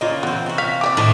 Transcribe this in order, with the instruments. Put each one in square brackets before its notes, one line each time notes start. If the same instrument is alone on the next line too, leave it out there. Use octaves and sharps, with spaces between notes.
[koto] A#2 C#3 A#3 [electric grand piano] F4 D#5
[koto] E3 C4 [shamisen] B3
[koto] C3 F#4
[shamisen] F5 [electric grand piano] B6
[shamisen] E3 G4 D5 [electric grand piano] D6
[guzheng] A2 [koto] D#3 F3 D#5